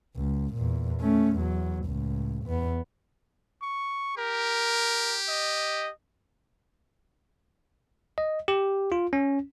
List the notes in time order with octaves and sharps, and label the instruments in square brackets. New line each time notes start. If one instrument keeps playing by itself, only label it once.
[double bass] C#2
E2 A#2
A3 C#4
E2 F#3
C#2 A2
E2 B3
[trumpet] C#6
[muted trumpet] G4 [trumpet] A#4
[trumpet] D#5
[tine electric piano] D#5
G4
F4
C#4